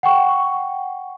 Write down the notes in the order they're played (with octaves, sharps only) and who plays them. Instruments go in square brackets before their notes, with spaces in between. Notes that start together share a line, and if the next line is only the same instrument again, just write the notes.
[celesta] F#5 G5 C#6